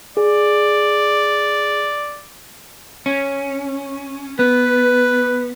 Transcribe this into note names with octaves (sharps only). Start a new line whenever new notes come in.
G#4 D5
C#4
B3 B4